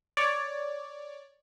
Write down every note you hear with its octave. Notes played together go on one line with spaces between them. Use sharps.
C#5 D5